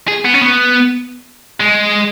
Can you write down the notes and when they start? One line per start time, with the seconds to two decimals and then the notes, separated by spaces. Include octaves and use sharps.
0.08 G#4
0.25 B3
0.34 C#4
0.41 B3
1.60 G#3